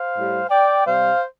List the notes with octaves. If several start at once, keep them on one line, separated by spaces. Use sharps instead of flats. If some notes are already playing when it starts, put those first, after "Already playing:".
Already playing: C5 F5
A2 G3
D5 G5
C3 G3 C5 F5